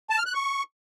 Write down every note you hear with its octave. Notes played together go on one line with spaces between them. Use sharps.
A5
F6
F#6
C#6